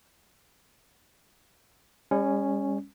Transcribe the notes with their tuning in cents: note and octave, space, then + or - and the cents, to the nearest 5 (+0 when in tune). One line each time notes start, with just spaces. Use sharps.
G3 +45 C#4 +0